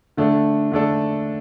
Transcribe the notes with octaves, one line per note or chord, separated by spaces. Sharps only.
D3 A3 D4 A4
D3 A3 D4 A4